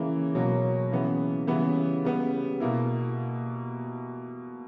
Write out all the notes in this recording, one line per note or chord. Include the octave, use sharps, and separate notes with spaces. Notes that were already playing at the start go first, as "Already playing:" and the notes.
Already playing: C#3 E3 A#3
B2 F#3 A#3
C#3 E3 B3
C#3 E3 G3 B3
C#3 G3 B3
B2 A#3 E4